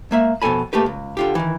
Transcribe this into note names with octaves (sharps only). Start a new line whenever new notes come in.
G#3 A#3 E5
F2 B2 D4 A4 G#5 B5
A3 A#3 G4 B4
C#2
D3 F4 G4
D#3 E3